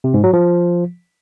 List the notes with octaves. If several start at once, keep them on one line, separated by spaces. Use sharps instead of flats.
C3
G#2
F#3
F3